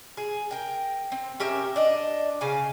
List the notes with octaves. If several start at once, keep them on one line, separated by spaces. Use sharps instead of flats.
G#4
A#4 G5
C4
C#4 G4 A#4 E5
D4 D#5
C#3 F5 G#5